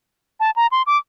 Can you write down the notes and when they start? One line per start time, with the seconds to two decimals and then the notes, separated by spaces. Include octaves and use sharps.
0.40 A5
0.56 A#5
0.72 C6
0.87 D6